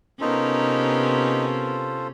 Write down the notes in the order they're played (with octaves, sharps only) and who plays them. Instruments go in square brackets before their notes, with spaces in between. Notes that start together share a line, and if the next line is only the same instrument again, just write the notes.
[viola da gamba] C3 C#4 [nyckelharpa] B3 A#4 [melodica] D#4 [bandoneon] F4 A4 C5